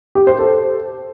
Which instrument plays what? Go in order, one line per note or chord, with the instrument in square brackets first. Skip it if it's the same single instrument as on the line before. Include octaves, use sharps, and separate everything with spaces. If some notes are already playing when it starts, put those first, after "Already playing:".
[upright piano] G4
C5
A4